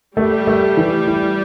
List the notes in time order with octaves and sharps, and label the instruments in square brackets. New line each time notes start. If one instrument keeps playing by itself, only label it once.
[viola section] G3 [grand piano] A3
[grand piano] A3
E3
E4